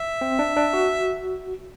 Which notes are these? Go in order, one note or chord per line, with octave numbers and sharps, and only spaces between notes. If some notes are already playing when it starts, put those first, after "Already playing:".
Already playing: E5
C4
D4
D4
F#4